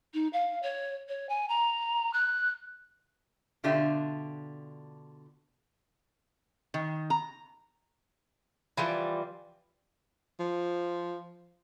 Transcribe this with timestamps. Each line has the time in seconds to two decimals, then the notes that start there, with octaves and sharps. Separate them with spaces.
0.13 D#4
0.33 F5
0.62 C#5
1.08 C#5
1.29 G#5
1.48 A#5
2.13 F#6
3.64 B2 D3 D4 F4 G4 E5
6.74 D#3
7.10 A#5
8.77 E3 F3 G3
10.39 F3